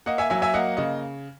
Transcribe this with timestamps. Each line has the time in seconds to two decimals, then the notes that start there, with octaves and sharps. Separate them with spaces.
0.06 A#3 D#5 F#5
0.18 E5 G#5
0.30 F#3 E5 G#5
0.42 E5 G#5
0.54 A#3 D#5 F#5
0.77 C#3 D#5